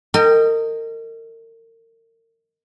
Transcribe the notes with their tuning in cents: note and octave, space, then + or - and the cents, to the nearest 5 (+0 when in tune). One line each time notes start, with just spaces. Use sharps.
A#4 -35 D#5 +0 G5 +10